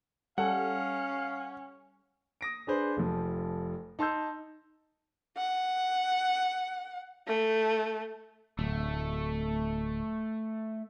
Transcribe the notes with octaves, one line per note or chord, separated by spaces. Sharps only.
G3 C#4 A4 F5 F#5
D#6 A#6 D7
D4 G#4 B4 C5
F1 F3
D#4 A5 C6 E6 G6
F#5
A3
D1 A3